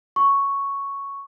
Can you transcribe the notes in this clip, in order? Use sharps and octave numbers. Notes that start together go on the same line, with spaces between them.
C#6